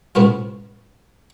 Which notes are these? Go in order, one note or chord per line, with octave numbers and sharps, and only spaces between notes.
A2 C3 B3 C#4 F4